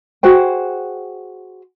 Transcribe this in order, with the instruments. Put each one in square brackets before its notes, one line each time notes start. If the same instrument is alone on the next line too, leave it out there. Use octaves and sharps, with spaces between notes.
[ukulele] F#4 G#4 C5 G5